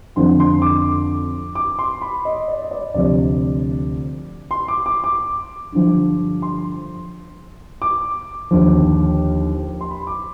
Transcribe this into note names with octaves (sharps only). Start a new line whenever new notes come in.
F2 D3 F3 C6
C6
D6
D6
C6
B5
D#5
D5
D#5
D5
D2 C3 F3 D5
C6
D6
D6
D6
G2 D3 F3
C6
D6
D#2 D3 F3
C6
B5
D6